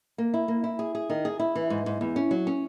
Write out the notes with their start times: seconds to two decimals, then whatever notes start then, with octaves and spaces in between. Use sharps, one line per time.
0.18 A#3
0.34 E4
0.48 A#3
0.64 E4
0.79 G#4
0.95 G#4
1.10 D#3
1.25 G#4
1.40 E4
1.55 E3
1.70 G#2
1.86 G#2
2.01 E2
2.16 C#4
2.31 F#3
2.47 C#4